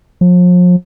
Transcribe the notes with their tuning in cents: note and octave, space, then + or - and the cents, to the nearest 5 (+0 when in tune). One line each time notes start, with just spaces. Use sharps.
F3 +40